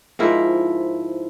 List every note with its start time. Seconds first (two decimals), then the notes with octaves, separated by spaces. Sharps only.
0.19 G#2 F3 E4 A#4